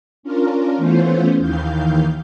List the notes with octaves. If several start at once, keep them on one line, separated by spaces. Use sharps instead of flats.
C#4 D4 F4 A#4
E3 A3 B3 C#4 F4 C5
D#2 D#3 E3 F5 G6